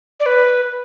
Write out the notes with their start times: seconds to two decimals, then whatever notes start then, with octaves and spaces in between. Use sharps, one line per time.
0.20 D5
0.26 B4